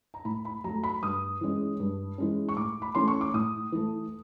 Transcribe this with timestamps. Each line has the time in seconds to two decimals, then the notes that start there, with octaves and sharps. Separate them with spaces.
0.14 A#5
0.25 A2 B5
0.45 B5
0.64 F#3 A3 A#5
0.84 B5
1.03 G2 D#6
1.41 E3 G#3 C#4
1.80 G2
2.18 E3 G#3 C#4
2.49 C#6
2.57 A2 D6
2.82 B5
2.95 E3 A3 C#4 C6
3.08 C#6
3.21 D6
3.34 A2 D#6
3.72 E3 A3